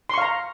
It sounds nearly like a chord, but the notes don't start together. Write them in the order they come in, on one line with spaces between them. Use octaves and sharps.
C6 C#6 F5 A#5